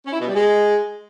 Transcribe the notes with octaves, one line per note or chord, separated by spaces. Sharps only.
C#4
E4
B2
G3
G#3